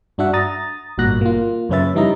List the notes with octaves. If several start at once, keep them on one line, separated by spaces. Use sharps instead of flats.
G2 D4 F#4 E5 F#5
A#5 D#6 A6
G#1 G2 A#2 F#4 F#6 A#6
A#3 F4
F#2 C#3 C#4 B4 E5 A6
F3 G3 D#4 E4 D#5 A#5